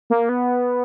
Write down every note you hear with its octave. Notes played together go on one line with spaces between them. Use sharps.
A#3
B3